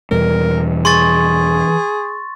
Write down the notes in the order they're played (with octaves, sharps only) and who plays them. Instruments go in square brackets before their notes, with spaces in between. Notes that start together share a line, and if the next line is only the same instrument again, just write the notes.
[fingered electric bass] E2 B2 G3 [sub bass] E3 [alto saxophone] A#4
[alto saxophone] G#4 [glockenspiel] C6 C#6 A6